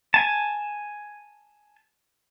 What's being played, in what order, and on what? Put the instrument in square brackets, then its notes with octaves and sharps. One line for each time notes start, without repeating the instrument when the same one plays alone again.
[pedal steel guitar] G#5 A5